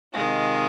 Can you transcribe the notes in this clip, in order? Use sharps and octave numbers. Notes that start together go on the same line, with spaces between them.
C3 D#3 G#3 F4